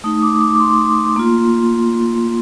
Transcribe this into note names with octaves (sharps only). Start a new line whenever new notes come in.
A3 D#4 D#6
D6
D6
D6
C6
A#3 F4